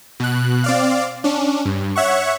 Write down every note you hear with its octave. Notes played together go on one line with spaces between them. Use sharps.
B2 F#6
C4 D5 F5
C#4 D4
G2
C#5 E5 F#5 C#6